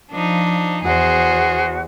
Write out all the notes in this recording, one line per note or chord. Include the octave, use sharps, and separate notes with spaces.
F3 D4 D#4
E2 F#4 G#4 C5